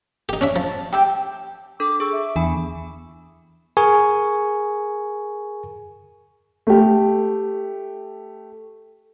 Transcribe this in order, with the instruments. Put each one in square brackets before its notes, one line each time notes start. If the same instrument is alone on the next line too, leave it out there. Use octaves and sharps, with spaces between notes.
[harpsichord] D#4 G4
C#4 D4 E5
[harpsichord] F3 [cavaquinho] A5
[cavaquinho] G4 E5 G5
[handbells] D4 A4 [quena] D6
[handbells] G#4 E6 [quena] C#6
[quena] E5
[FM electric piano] E2 [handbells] D4 G#5 B5
[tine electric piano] G#4 A#4 G#5 C#6
[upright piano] A3 G4